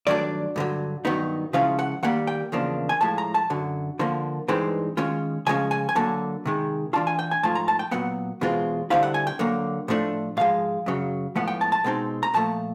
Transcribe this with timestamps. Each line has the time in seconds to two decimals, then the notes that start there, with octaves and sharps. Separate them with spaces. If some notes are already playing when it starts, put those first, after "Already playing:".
0.07 G2 D#3 F#3 A3 D4 D5
0.56 G2 D3 F#3
1.05 G2 D#3 F#3 B3 D#4
1.53 C#3 F3 G#3 C#4 E4 F5
1.79 F#5
2.03 D#3 G3 A#3 F#5
2.27 G5
2.52 E2 C#3 F3 A#3 D4
2.89 G#5
3.01 A2 F3 G#3 A5
3.18 A#5
3.34 A5
3.50 F#2 D3 F#3
3.99 D3 F3 A#3
4.48 G2 E3 G#3 C4 D#4
4.97 D#3 G#3 C#4 F4
5.46 C#3 F3 G#3 C#4 G#5
5.71 G#5
5.89 G#5
5.95 D3 F#3 A#3 A5
6.45 C3 D#3 G#3
6.93 E3 A3 D4 F4 A5
7.07 G#5
7.19 G5
7.31 G#5
7.43 G#2 F3 A3 F4 A5
7.55 A#5
7.68 A5
7.79 G5
7.91 A#2 F#3 B3 F#5
8.41 E2 B2 G#3 C4 F4
8.90 D3 G3 C4 E4 F5
9.03 F#5
9.14 G#5
9.27 G5
9.39 D3 F#3 A#3
9.88 A2 F3 A3 D4
10.37 G#2 F3 G#3 F5
10.86 F#2 C#3 F#3
11.36 A2 F3 G#3 B3 F#5
11.48 G5
11.61 A5
11.72 A5
11.84 B2 G#3 C4 D#4
12.23 A#5
12.34 A#2 F3 A3 A5